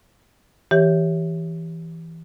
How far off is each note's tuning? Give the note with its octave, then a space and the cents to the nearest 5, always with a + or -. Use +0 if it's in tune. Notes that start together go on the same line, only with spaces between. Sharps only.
E3 -5 G4 +0 C#5 +0